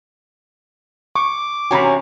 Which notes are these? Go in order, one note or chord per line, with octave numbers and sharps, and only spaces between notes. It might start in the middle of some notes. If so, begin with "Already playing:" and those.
C#6 D6
E2 C3 C#4 F#4 G#5 A#5 B5